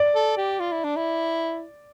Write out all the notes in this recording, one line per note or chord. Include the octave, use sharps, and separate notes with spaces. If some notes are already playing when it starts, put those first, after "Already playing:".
Already playing: D5
A4
G4
F4
E4
D4
E4